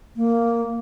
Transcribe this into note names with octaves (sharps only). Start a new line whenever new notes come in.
A#3